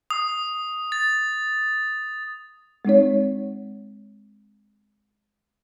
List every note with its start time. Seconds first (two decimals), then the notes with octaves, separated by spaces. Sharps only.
0.10 D#6
0.92 A6
2.85 G#3 C4 D#4 C#5